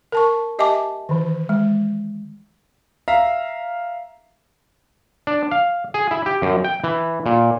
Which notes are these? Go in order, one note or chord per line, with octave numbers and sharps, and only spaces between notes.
A#4 A5 C#6
G4 D#5 E5 G#5 A5 D6
D#3 E3
G#3
E5 F5 A#5
D4
F5
G#4
E4
G4
F#2
G5
E3
A#2